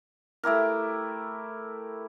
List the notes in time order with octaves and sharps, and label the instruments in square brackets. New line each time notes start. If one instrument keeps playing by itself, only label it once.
[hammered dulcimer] A3 E4 G4 A#4